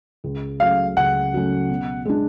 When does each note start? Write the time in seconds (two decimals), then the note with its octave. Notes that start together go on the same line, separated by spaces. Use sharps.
0.24 C#2
0.60 C#3 F#3 A3 C#4 F5
0.96 C#2 F#5
1.33 C#3 F#3 A3 C#4
1.70 B2
2.05 G#3 B3 D4